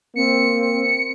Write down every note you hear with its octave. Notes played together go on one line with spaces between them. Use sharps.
A#3 C4 C#7